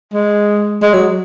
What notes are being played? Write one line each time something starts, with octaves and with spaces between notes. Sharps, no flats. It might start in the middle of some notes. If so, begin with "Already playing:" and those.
G#3
G#3
F#3